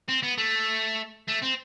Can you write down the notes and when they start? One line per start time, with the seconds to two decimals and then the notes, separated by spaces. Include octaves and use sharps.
0.09 C4
0.23 B3
0.38 A3
1.28 A3
1.43 C4